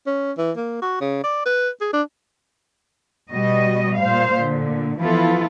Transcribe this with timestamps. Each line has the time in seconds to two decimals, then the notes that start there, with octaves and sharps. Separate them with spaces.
0.06 C#4
0.37 E3
0.57 A#3
0.82 F#4
1.01 C#3
1.24 D5
1.45 B4
1.81 G#4
1.93 D4
3.32 B2 G3 F#4 D#5
3.97 A#2 C5 F5
4.33 A#2 D3
5.00 E3 F3 B3 E4 F4 A4